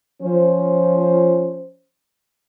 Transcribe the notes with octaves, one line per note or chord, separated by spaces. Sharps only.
F3 C#4 C5